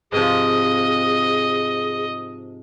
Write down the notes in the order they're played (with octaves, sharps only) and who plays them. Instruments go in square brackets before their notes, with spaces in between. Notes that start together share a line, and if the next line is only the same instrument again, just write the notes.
[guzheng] G#2 C3 F3 [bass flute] G#4 [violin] D#5